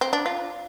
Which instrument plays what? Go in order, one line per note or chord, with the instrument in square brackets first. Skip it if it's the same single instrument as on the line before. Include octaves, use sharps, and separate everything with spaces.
[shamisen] C4
D4
F4